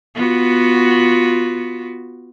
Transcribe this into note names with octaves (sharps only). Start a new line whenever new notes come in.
B3 F4 F#4